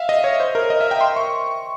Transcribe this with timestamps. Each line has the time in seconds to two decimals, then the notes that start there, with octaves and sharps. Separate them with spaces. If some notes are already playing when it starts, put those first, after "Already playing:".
Already playing: E5 F5
0.09 D#5
0.24 C#5
0.40 C5
0.55 A#4
0.70 D#5
0.81 E5
0.91 G5
1.01 C6
1.16 C#6